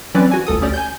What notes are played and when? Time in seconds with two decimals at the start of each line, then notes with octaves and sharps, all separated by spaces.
0.14 E3 F#3 C4 C#4 B4 D5
0.31 F#4 G#5
0.47 G1 D2 A4 D#6
0.61 D2 C#4 G4 D5
0.74 G#5 G6